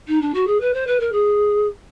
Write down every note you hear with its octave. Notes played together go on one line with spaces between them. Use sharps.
D#4
D4
F#4
G#4
B4
C5
B4
A#4
G#4